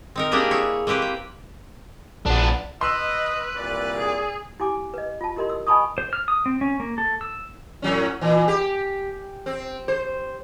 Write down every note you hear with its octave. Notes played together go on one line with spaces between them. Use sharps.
C4 D#4 A#4
A#3 D4 E4 G4 G#4 D#5
E4 G#4 C#5
A#3 C4 G4 B4 C5
G5
A#1 B3 D4
B4 D#5 C6 E6
C2 A#2 D5
G#4
E4 G4 G#5 D6
B4 D#5
F4 A5
E4 G4 A#4 D#5 C6
E6
D#5 G#5 A5 B5 C#6 D#6
C5
F6
D#6
C4
C#4
A#3
A4
E6
A2 F#3 C#4
A#2 E3
G4
C4
C5